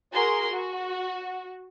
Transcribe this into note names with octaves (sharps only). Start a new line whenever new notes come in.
F#4 G#4 A#4 C6
F#4